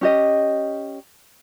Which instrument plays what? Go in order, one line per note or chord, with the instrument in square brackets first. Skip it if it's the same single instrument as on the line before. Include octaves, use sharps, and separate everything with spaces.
[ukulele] C#4 G4 D#5